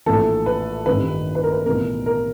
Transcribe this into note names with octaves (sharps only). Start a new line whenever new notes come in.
A#1 A2 E3 A4
B4
A1 G2 D#3 B4
B4
A#4
B4
B1 A2 E3 A#4
A#4